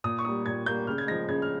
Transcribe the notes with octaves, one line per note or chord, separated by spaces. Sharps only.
A#2 D#6
C#6
G3 A#3 D#6
A#2 G#6
G3 A#3 G6
C#3 F6
G#6
F3 G#3 A#6
C#3 G#6
F6